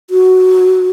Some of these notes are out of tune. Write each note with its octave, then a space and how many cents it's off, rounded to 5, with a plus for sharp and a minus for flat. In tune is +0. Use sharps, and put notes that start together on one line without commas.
F#4 +5